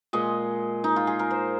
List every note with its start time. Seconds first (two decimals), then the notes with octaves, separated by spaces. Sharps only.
0.13 A#2 G#3 D#5
0.84 D#4
0.96 F4
1.07 G#4
1.19 A#4
1.30 C5